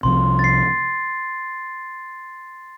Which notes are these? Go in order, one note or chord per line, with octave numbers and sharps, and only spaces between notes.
C2 C3 F3 C6
A6
C7